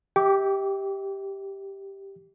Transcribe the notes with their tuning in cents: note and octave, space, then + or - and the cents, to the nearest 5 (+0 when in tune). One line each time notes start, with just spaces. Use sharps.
G4 +0 E5 -45 D6 -35